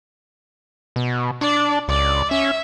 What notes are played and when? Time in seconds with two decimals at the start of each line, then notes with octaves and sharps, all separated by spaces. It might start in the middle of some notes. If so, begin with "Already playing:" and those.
0.96 B2
1.41 D4 D5
1.88 C#2 D5
2.31 C#4 E5